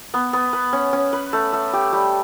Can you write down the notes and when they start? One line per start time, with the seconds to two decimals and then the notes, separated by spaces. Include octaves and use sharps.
0.14 B3
0.33 B3
0.53 B4
0.73 C#4
0.93 C#4
1.13 B4
1.33 A3
1.53 A3
1.73 G4
1.93 G3